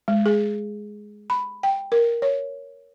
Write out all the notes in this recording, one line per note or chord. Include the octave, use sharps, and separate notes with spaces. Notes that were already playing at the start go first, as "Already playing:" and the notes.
G#3
G#4
B5
G5
A#4
C#5